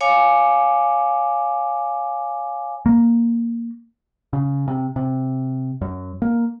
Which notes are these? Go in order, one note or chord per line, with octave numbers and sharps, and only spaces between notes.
C#5 F5 G#5 D6
A#3
C#3
C3
C3
F#2
A#3